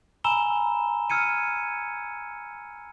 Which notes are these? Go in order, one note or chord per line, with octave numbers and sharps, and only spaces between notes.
G#5 A#5 B5 E6 E7 G7
E6 F6 G#6 C#7 D#7